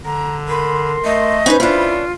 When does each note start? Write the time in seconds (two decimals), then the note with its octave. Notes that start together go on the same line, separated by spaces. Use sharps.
0.05 D3 A#5
0.49 A#4 B5 C6
1.05 A3 D#5
1.46 C#4 D#4 B4 C5 B5
1.60 C#4 D4 E4 F4